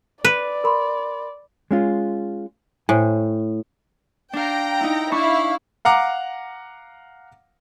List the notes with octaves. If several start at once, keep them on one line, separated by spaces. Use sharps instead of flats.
B4 D5
A#4 B5 C6
G#3 C#4 F4
A2 C5 G#5
D4 F5 G5 A#5
D#4 E4
D4 E4 F5 B5 C#6
F5 F#5 A#5 D6